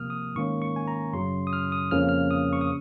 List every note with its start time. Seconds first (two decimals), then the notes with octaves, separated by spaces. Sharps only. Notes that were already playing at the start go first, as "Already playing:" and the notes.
Already playing: C3 F3 A#3 D#6 F6
0.10 D#6
0.35 G#2 D#3 A#3 C#4 C#6
0.62 C#6
0.76 G#5
0.88 A#5
1.13 F#2 C#3 F#3 C6
1.47 D#6
1.53 F6
1.72 D#6
1.91 F2 C#3 F3 A#3 C#4 F6
2.09 F6
2.31 D#6
2.53 C#6
2.61 D#6